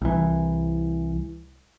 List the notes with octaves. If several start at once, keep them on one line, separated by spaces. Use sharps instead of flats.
C2 E3